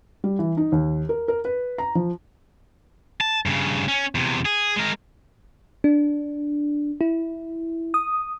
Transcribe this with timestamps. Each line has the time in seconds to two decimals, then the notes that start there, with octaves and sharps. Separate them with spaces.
0.24 G3
0.39 E3
0.57 D#4
0.72 D#2
1.09 A#4
1.28 A#4
1.45 B4
1.78 A#5
1.95 F3
3.21 A5
3.46 G2 C#3
3.88 C#4
4.15 E2 C3
4.45 G#4
4.76 G#3 A#4
5.84 D4
7.01 E4
7.94 D#6